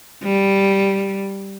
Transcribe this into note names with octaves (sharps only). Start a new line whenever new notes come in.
G3